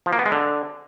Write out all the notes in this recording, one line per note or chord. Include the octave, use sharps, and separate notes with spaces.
F3
A#3
B3
G#3
D3